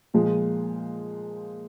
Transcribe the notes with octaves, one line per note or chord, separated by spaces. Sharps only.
A#2 F3 G#3